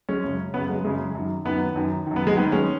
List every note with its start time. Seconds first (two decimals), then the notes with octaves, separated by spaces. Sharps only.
0.09 G#3 C#4
0.24 F#2 C#3
0.54 F#2 C#3 B3
0.69 G#3
0.84 F#2 C#3 G#3
1.15 F#2 D#3
1.45 F#2 D#3 B3
1.76 F#2 D#3
2.07 F#2 D#3
2.16 B3
2.27 G#3
2.37 G#2 D#3 B3
2.52 G#3 C#4